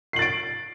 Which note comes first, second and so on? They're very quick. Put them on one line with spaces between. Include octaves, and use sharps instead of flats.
C7 F#7 A6 D7